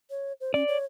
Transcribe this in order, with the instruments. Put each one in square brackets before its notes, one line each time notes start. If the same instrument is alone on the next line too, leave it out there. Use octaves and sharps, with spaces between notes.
[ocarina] C#5
C5
[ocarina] C#4 [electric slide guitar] D5
[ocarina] C#5